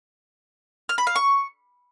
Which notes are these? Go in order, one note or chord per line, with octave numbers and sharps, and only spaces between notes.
F6
B5
F5
C#6